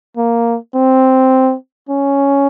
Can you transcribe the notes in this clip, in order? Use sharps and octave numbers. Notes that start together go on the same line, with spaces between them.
A#3
C4
C#4